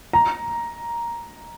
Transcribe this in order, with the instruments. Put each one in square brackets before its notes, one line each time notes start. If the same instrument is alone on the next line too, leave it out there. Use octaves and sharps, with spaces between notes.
[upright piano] A#5